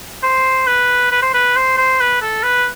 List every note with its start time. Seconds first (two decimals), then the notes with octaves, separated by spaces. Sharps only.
0.23 C5
0.67 B4
1.12 B4
1.22 C5
1.34 B4
1.56 C5
1.77 C5
2.00 B4
2.22 A4
2.44 B4